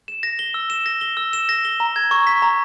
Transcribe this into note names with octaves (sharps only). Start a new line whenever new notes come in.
E7
A#6
G7
E6
E7
A#6
G7
E6
E7
A#6
G7
A#5
G#6
C#6
B6
A#5